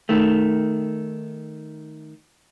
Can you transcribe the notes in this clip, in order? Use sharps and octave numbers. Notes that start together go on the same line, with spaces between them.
D#3 A3